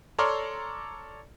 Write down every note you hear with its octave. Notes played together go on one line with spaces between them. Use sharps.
A4 C#5 D5 A#5 C6 F6